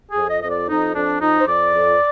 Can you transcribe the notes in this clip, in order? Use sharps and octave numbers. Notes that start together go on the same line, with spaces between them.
G#4
F2
D#5
F2 D#5
D5
F2 D#4
F2 D4
F2 D#4
C5
F2 D5
F2